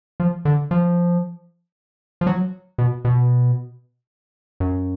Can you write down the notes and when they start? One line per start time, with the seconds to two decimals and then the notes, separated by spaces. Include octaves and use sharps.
0.20 F3
0.45 D3
0.71 F3
2.21 F3
2.27 F#3
2.78 B2
3.05 B2
4.60 F#2